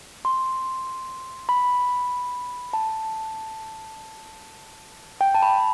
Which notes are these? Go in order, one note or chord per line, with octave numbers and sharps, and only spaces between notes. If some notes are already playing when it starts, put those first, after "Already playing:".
C6
B5
A5
G5
A5
B5